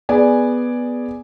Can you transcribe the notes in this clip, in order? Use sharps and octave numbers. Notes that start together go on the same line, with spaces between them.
B3 G#4 D5 G#5